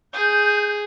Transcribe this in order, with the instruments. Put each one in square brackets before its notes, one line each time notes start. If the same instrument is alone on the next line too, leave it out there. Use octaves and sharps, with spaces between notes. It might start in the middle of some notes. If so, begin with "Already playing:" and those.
[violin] G#4 [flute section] G6